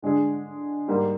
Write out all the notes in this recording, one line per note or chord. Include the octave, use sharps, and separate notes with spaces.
D3 G#3 D4 G#4
G#2 G3 A#3